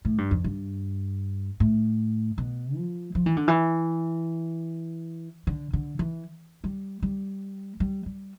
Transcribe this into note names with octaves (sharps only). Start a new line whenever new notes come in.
A2
G2
F2
G2
A2
B2
F3
F3
E3
D3
E3
D3
D3
E3
G3
G3
G3
G3